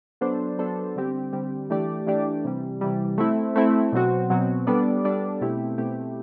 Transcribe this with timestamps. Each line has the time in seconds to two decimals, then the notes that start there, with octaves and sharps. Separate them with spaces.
0.21 F#3 B3 D4 A4 C5
0.58 F#3 B3 D4 A4 C5
0.96 D3 G3 C4 G4
1.33 D3 G3 C4 G4
1.70 E3 A3 D4 G4 D5
2.07 E3 A3 D4 G4 D5
2.44 C3 E3 G3
2.81 C3 E3 G3
3.18 A3 C4 E4
3.56 A3 C4 E4
3.92 B2 F#3 C4 F#4
4.30 B2 F#3 C4 F#4
4.67 G3 B3 D4 A4 D5
5.04 G3 B3 D4 A4 D5
5.41 B2 A3 C4 E4 G4
5.78 B2 A3 C4 E4 G4